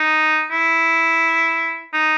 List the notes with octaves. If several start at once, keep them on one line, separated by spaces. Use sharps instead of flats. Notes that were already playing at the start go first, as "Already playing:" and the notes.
Already playing: D#4
E4
D#4